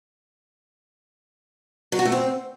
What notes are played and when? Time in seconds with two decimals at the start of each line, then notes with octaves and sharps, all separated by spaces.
1.92 F#3
1.99 F#4
2.05 A3
2.12 C4